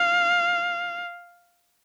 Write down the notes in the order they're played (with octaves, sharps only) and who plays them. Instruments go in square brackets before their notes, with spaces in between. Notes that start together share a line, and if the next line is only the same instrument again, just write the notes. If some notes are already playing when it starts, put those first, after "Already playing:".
Already playing: [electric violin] F5